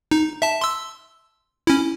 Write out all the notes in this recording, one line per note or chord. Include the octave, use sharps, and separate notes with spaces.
D#4
E5 A5
C6 E6
C#4 E4